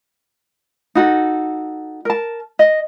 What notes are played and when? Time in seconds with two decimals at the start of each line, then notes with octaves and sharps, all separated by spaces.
0.95 D#4 F#4 A4
2.05 A#4 A5
2.59 D#5